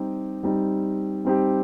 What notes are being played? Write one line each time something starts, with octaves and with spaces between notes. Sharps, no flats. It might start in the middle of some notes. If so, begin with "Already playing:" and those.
Already playing: G3 C4 D#4 G4
G3 C4 D#4 G4
G3 C4 D#4 G4